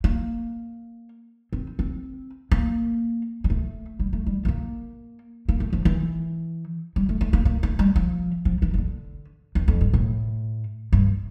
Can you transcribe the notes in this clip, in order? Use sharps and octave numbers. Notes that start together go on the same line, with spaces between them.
A#3
C4
C4
A#3
G3
A3
G3
A3
G3
A3
A#3
A#3
A3
F3
E3
G3
A3
A3
A#3
A#3
A3
G3
F3
F3
E3
E3
D3
E2
F2
G2
A2
G2